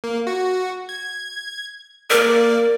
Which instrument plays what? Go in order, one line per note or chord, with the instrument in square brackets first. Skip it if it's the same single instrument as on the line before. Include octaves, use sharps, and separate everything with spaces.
[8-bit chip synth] A#3
F#4
G#6
[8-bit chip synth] A#3 D5 [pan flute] A#4